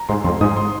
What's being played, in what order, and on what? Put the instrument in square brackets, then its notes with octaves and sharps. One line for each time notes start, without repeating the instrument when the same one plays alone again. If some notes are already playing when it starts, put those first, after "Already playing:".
Already playing: [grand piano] A#5
[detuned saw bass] G#2 [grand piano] C6
[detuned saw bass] F2 [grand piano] C6
[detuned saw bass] G#2 [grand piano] D#6
[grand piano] C6